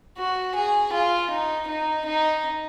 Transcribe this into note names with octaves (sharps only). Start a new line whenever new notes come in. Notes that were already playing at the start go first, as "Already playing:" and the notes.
F#4
G#4
F4
D#4
D#4
D#4